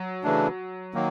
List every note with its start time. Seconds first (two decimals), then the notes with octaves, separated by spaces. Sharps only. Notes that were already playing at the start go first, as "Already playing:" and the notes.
Already playing: F#3
0.24 C#3 E3 A3 D4
0.94 D#3 F#3 A#3